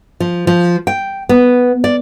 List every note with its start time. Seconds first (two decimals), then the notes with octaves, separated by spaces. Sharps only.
0.20 F3
0.47 F3
0.87 G5
1.29 B3
1.84 D5